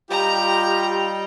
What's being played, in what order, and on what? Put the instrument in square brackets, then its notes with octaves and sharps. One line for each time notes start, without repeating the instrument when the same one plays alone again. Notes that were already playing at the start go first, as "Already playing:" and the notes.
[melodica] G3 D#5 G5 [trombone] F4 [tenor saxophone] G4 [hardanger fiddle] A#5